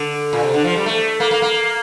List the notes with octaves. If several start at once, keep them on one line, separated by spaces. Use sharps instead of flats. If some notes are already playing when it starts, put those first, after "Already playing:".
Already playing: D3
A#2
C3
D3
F3
G3
A3
A#3
A#3
A#3